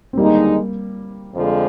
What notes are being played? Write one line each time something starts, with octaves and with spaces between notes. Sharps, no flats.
C4
D#2 D3 G3 G#3 A#3 D#4
F2 D3 F3 G#3